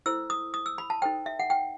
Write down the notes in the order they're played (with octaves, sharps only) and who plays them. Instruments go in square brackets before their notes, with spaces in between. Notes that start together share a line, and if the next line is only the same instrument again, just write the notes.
[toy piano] E4 A4 C5 E6
D#6
D#6
E6
B5
A5
D#4 A4 C5 G5
E5
F#5
G5